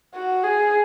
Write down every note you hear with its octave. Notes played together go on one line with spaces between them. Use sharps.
F#4
G#4